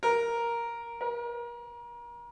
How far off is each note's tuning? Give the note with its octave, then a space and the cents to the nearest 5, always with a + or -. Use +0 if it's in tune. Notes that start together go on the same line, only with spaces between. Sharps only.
A#4 +5
A#4 +35